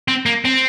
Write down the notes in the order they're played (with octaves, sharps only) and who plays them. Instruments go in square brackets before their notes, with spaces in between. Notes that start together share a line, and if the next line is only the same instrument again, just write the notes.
[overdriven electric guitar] C4
A#3
C4